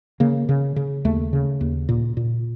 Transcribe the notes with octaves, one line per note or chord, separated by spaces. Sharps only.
C#3 A#3
C#3
C#3
D#2 A3
C#3
D#2
A#2
A#2